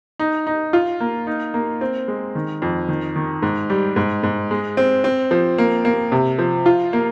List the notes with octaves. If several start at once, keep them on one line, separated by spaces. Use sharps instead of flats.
D#4
D#4
F4
A#3
D#4
A#3
C4
G#3
D#3
F2
D#3
D#3
G#2
G3
G#2
G#2
G#3
C4
C4
F3
A#3
A#3
C3
F3
F4
A#3